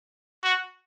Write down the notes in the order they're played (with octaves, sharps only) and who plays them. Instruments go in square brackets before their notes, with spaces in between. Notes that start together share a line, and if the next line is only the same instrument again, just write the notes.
[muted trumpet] F#4